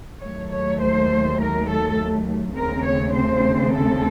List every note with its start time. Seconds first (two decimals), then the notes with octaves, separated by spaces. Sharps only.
0.22 D#2 D#3 F#3 A3 C#5
0.51 C#5
0.81 C5
1.40 A#4
1.68 A4
2.56 D#2 C#3 A3 C4 A#4
2.86 C#5
3.15 C5
3.74 A4